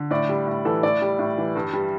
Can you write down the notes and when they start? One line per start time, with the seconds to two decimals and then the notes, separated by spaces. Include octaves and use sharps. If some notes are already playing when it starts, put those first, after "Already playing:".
Already playing: D3
0.11 A2 D5
0.29 G3
0.47 A2
0.65 E3 A4
0.83 A2 D5
1.02 G3
1.19 A2
1.38 E3
1.55 G2
1.73 G3